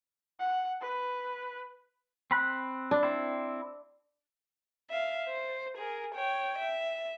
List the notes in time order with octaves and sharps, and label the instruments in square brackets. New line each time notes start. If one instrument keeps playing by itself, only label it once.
[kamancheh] F#5
B4
[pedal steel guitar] C4 B5 F#6
[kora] D4
[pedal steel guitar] C4 E4
[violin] E5 F5
C5
G#4 A#4
C#5 G5
E5